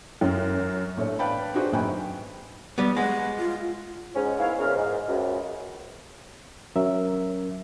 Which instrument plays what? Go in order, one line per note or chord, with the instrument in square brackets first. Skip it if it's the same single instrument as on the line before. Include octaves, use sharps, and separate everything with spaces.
[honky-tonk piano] F#2
[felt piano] A1 A3 D4 C#5
B4 D5 F5 G5 A5 B5
D4 D#4 F#4 G#4 B4 C5
G#1 F#2 G5 G#5 B5
[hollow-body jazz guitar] G3 B3
[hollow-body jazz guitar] G#3 [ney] F#5
[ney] F4
[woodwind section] G#2 C#4
A#3 B3 E4 C#5 F5
E2 A#2 C#3 F6
G#2
C#2 F#2
[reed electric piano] F#3 C#4 A#4 E5